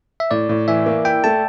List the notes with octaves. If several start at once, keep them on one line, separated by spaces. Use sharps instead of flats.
E5
A2 D5
A2
E3 E5
A#3
E4 G5
A3 A5